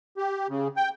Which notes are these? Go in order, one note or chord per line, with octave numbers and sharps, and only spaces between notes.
G4
C#3
G5